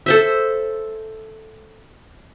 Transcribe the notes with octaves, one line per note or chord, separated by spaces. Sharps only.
A4 C5 E5